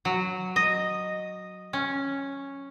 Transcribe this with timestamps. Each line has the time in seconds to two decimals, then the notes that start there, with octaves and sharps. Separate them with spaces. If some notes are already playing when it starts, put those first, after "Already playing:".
0.05 F#3
0.56 D#5
1.73 C#4